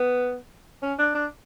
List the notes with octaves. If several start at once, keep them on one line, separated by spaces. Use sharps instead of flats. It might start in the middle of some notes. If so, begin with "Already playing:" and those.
Already playing: B3
C#4
D4
D4